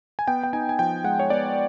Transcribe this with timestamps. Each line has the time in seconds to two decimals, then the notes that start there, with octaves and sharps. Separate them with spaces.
0.19 G#5
0.28 B3 G5
0.43 G5
0.53 D#4 G#5
0.69 G#5
0.79 F3 G5
1.04 G#3 F#5
1.19 C#5
1.30 B3 D5